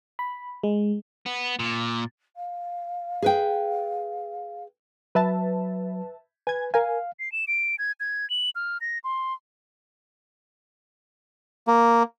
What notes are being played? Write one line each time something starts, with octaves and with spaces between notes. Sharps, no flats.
B5
G#3
B3
A#2
F5
G#4 B4 G5
F#3 B4 E5 A5
B4 G#5 G#6
A#4 F5 G#5
C7
E7
D7
G#6
G#6
F#7
F6
A#6
C6
A#3